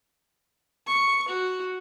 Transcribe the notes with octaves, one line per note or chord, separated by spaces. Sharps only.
C#6
F#4